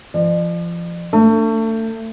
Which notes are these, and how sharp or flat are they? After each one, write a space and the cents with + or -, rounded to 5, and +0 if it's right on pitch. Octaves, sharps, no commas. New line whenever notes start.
F3 -30 D5 +45
A3 +30 D4 +0